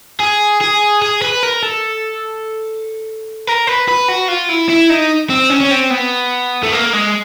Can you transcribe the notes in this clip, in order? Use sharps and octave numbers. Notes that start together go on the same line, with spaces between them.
G#4
G#4
G#4
B4
A#4
A4
A#4
B4
B4
F#4
F4
E4
E4
D#4
C4
C#4
C#4
C4
B3
A3
A#3
G#3